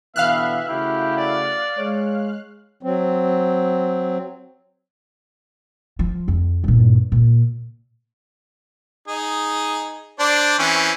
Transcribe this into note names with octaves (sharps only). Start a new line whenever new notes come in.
B2 D3 E3 B3 E5 F5 F6 F#6
C#3 A3 E4 F#4 G4
D5
G#3 C#5
F#3 C4
F3
F2
G2 A#2
A#2
D#4 G#4
D4 C5 D5
E3 C4 C#4